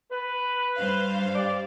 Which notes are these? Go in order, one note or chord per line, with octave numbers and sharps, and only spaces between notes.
B4
G2 C5 F5
G3 D5